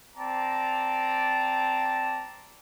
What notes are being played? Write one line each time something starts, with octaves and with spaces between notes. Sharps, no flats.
C4 D5 A5 A#5